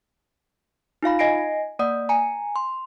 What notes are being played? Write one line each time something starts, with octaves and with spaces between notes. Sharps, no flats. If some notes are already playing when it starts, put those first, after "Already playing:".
D#4 F4 F5 B5
D#5 G#5 A#6 C7 D7
A#3 D5 F#5 D#6
G#5 A#5
C6